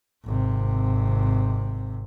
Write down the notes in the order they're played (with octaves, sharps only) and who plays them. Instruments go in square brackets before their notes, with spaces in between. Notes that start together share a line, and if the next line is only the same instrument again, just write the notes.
[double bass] G#1 C3